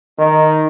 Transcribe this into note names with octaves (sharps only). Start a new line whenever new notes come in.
D#3 D#4